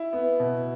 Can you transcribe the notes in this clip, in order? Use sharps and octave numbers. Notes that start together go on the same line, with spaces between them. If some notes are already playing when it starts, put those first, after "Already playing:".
Already playing: E4
B3
B2